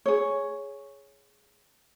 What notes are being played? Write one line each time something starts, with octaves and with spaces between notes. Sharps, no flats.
G#4 C#5